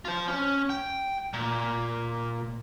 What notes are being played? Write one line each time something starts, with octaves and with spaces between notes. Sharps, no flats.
F4 C5
C#4
G5
A#2